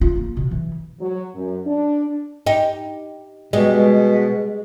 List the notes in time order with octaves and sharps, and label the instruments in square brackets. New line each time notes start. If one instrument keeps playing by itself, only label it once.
[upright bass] F4
A#3
B2
E3
[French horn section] F#3
F#2
D4
[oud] D#4 G4
[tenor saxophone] B2 [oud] G3 G#3